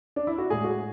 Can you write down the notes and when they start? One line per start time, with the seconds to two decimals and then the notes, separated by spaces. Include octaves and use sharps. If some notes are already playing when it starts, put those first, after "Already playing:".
0.16 D4
0.27 E4
0.38 F#4
0.50 A2 G#3 G#4
0.64 F#4